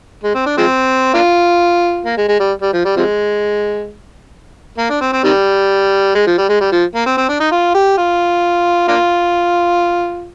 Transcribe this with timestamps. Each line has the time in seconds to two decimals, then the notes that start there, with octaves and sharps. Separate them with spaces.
0.23 G#3
0.34 C4
0.46 D4
0.57 F3 G#3 C4
1.14 A#3 D4 F4
2.05 A#3
2.17 G#3
2.29 G#3
2.40 G3
2.62 G3
2.73 F3
2.85 G3
2.96 C3 F3 G#3
4.78 A#3
4.90 D4
5.01 C4
5.13 C4
5.24 C3 D#3 G3
6.15 G#3
6.27 F3
6.38 G3
6.49 G#3
6.60 G3
6.72 F3
6.95 A#3
7.06 C4
7.17 C4
7.29 D4
7.40 D#4
7.52 F4
7.75 G4
7.98 F4
8.88 A#3 D4 F4